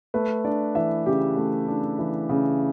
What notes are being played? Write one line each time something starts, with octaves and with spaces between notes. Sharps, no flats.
A3 B4
D4 D5
E3 E5
C#3 G4
A3
D4
E3
C#3